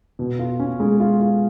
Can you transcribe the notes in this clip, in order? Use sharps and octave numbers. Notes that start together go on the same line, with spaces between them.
B2
F4
C#4
G#3
F4
F4